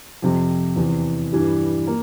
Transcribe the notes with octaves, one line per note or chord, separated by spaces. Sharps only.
F2 C3 F3
E2 C3 E3
G2 E3 G3
A#3